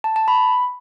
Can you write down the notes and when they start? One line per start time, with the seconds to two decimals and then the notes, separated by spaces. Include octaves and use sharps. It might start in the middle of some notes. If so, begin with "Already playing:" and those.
0.04 A5
0.16 A5
0.28 B5